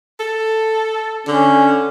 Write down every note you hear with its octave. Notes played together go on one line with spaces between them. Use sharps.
A4
D3 C#4